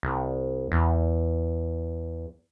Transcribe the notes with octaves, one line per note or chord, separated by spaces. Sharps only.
C2
E2